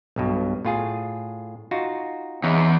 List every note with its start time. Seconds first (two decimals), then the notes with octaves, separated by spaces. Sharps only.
0.16 B1 G2 B2
0.65 A2 F4 G#4
1.71 D#4 F4 F#4
2.44 E2 D#4 E4 C#5